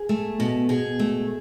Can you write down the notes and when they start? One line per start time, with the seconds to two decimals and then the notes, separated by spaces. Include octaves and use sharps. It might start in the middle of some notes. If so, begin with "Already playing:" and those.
Already playing: G#4
0.09 A3
0.40 B2
0.69 B2 G#4
0.99 A3